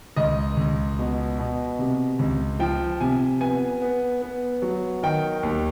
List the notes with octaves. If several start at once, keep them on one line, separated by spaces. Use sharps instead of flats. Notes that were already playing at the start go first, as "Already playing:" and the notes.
C#2 D#5
C#2
B2
B2
C3
C#2
F3 G5
C3 G#5
B3 G#5
B3
B3
F#3
D#3 G5
D#2